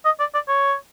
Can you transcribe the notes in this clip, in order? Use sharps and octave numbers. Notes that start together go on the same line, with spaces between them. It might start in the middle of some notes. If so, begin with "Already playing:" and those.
D#5
D5
D5
C#5